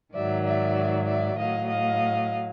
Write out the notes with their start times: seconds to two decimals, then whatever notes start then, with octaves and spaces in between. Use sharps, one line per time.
0.13 G#2 D#3 F#3 D5 E5
0.44 D5 E5
1.06 D5 E5
1.37 A2 F#3 D#5 F5
1.69 D#5 F5